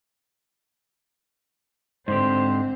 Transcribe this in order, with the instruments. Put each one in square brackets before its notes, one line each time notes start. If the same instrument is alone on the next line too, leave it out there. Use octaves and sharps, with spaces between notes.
[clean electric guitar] G#2 D3 G4 [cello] C4 [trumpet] C5